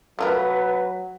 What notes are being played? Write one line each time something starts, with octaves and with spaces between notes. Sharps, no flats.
F#3 A3 F4 A#4 B4